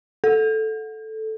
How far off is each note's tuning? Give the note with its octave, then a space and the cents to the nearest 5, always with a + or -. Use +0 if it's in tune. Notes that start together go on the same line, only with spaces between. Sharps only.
A4 -5